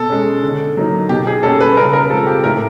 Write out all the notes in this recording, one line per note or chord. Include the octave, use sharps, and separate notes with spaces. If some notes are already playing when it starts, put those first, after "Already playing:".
Already playing: B2 A4
G#3 C#4
D3
F#3 A#3 D#4
B2 G4
G#4
G3 A#3 C#4 A4
B4
C#3 A#4
A#4
F3 G#3 C4 A4
G4
A2 A#4